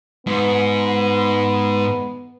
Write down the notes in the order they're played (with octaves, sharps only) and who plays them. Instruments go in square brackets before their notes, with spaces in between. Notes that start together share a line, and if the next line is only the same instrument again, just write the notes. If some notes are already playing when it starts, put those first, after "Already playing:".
[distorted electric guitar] G#2 [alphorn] B3